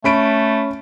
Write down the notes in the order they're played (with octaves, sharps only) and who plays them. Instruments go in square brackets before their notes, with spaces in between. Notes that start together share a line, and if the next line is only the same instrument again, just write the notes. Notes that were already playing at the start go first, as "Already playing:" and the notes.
[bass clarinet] A3 [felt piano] C#4 B5 D7